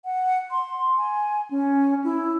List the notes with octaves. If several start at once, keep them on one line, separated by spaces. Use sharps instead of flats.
F#5
C6
G#5
C#4
E4